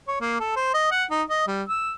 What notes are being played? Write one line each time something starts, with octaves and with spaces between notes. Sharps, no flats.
C#5
A#3
A4
C5
D#5
F#5
D#4
D#5
G3
E6